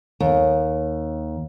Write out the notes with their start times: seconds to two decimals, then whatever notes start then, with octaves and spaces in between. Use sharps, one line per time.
0.20 D#2